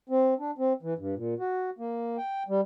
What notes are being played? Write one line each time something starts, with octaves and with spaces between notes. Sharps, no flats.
C4
D4
C4
E3
G2
A#2
F#4
A#3
G5
G3